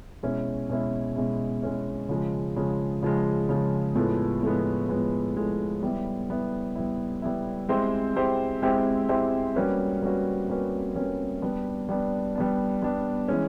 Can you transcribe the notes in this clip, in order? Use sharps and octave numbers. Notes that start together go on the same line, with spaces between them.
B2 G#3 C#4 E4
B2 G#3 C#4 E4
B2 G#3 C#4 E4
B2 G#3 C#4 E4
C#3 F3 G#3
C#3 F3 G#3
C#3 F3 G#3
C#3 F3 G#3
A2 F3 G#3 B3
A2 F3 G#3 B3
A2 F3 G#3 B3
A2 F3 G#3 B3
G3 B3 E4
G3 B3 E4
G3 B3 E4
G3 B3 E4
G#3 C4 E4 G4 C5
G#3 C4 E4 G4 C5
G#3 C4 E4 G4 C5
G#3 C4 E4 G4 C5
G3 A#3 C#4 F#4 B4
G3 A#3 C#4 F#4 B4
G3 A#3 C#4 F#4 B4
G3 A#3 C#4 F#4 B4
G3 B3 D4
G3 B3 D4
G3 B3 D4
G3 B3 D4
E3 G#3 C#4